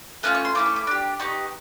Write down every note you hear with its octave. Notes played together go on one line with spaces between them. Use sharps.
A3 C#4 F4 F#6
C#6
C6
A3 C#4 E4 D6
C#6
D6
D4 G4
B3 D#4 G4 C#6